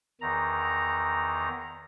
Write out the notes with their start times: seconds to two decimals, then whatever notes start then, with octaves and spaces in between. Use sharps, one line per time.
0.21 E2 D#3 A#5